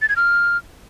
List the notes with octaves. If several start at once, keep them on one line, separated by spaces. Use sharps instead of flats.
A6
G#6
F6